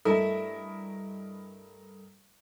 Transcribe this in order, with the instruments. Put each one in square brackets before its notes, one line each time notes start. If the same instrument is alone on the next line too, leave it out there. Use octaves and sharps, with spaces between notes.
[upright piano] G2 A3 [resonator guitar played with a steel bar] E4 [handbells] A4 D#6 [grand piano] A#4 D#5 A5